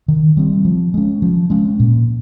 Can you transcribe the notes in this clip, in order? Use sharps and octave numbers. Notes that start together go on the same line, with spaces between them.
D#3
G3 C4
F3
G#3 C#4
F3
G#3 C#4
A#2